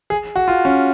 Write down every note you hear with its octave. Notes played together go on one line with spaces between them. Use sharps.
G#4
F#4
F4
C#4